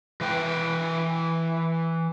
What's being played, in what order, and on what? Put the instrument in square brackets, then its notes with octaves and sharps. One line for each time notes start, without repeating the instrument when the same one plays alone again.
[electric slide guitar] E3 B4 G5